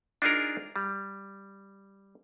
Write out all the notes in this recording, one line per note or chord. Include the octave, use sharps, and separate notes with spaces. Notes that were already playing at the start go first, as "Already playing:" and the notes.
D4 D#4 F4 G#4 A#4
G3